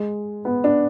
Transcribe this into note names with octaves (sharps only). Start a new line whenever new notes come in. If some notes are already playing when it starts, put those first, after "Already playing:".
Already playing: G#3
B3
D4